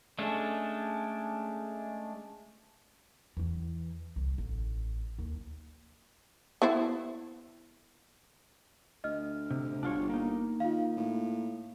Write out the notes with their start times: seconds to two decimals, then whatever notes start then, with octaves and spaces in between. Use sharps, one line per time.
0.19 G#3 A3 C#4 D4 A4
3.37 E2 E3
4.16 C2
4.38 A1
5.18 D#2
6.62 B3 E4 C5
9.04 D2 D#5 F6
9.51 C3
9.83 G1 D4 F4 C#5
10.10 A#3 D#4
10.60 D#3 F4 F5
10.97 A2